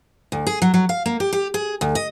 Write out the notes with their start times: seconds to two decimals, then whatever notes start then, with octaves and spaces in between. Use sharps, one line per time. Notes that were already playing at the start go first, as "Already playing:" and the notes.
0.32 D2
0.47 G#4
0.62 F#3
0.74 F#3
0.89 F5
1.06 A#3
1.20 G4
1.33 G4
1.54 G#4
1.81 D2
1.95 D#5